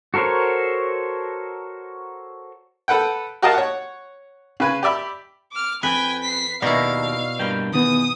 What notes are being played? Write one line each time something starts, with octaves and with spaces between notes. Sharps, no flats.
F#4 A4 A#4 C5 C#5
A4 B4 F#5 G5
F#4 G4 A#4 D#5 F5 A5
C#5 F#5
C#3 B4 G#5
G4 D5 E5 B5
D6 F6
F2 B4 G5 G#5
B6 C7
D#2 B2 E4 A#4 D5 D#5 F5 C#6
G2 A#3 G5
E2 D#3 B3 D#6